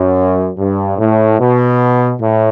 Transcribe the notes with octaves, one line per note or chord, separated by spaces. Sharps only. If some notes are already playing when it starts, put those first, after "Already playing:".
Already playing: F#2
G2
A2
B2
A2